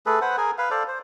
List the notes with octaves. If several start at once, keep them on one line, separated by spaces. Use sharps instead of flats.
A3 G#4 A4 B4
B4 C5 F#5
G#4 A#4 G#5
B4 F5
A4 C5 D5 F5
C5